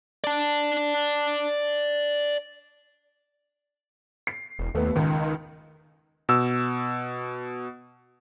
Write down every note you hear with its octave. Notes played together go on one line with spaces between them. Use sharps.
D5 A5
C7
E1
D#2 A3 B3
C#2 D#3
B2 E6